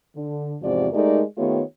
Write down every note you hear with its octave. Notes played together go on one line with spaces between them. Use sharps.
D3
E2 G#2 C3 F3 F#4 D5
G#3 A3 D#4 G4 A#4 D5
D#3 A3 B3 F4 G4 C#5